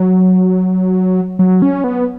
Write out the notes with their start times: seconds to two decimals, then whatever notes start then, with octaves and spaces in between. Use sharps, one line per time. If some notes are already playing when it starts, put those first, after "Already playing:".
Already playing: F#3
1.39 F#3
1.62 C#4
1.84 B3